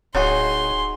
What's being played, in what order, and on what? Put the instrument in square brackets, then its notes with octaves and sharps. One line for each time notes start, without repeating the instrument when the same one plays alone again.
[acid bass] D1 [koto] D#4 F#4 G#4 [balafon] C#5 [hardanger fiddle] C6